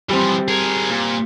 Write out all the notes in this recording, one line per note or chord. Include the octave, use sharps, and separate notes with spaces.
E3 F3 G3 C4
G#4 A#4
A#2